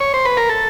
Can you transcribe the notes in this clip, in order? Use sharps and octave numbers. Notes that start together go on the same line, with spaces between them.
C#5
C5
B4
A#4
A4